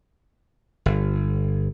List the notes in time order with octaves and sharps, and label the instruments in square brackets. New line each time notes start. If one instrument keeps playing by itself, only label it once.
[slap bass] G1